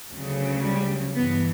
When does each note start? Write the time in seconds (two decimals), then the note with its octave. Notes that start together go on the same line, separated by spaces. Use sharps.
0.12 D2 C#3 F#3
0.64 G3
1.15 G2 E3 B3